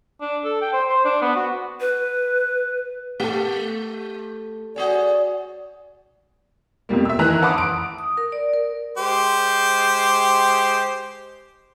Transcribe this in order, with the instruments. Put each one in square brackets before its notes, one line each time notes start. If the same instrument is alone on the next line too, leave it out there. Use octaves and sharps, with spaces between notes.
[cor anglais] D4
A4
G5
C5
C5
D4
B3
F#4
[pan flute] B4
[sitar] A3 [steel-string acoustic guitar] G4 A4
[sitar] F#4 G#4 C#5 [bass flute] D5
[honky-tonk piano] F2 B2 G3 A#3
E5 E6
D#3 E3 A#5 F#6
F#5 A5 B5 C6 D6 D#6
D7
[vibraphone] D#6
A#4
D5
A#4
[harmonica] G#3 G4 C5